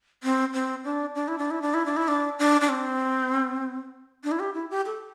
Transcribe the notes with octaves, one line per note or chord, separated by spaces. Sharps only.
C4
C4
D4
D4
E4
D4
E4
D4
E4
D4
E4
D4
D4
D4
C4
D4
E4
G4
E4
G4
A4